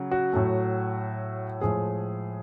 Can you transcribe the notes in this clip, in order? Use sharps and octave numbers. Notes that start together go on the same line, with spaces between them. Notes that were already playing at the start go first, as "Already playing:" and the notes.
Already playing: C#3 F#3
F#4
A2 F#3 A3
A2 F3 G#3 G#4